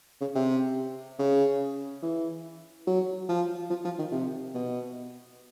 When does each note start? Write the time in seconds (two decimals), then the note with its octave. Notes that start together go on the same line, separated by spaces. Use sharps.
0.21 C#3
0.35 C3
1.19 C#3
2.03 E3
2.87 F#3
3.29 F3
3.70 F3
3.85 F3
3.99 D#3
4.12 C3
4.54 B2